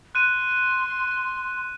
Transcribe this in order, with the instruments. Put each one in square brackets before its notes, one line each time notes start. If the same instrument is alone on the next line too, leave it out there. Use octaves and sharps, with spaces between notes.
[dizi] C6 [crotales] F#6 D#7